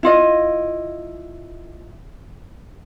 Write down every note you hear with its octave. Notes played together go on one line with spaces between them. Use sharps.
E4 F4 D#5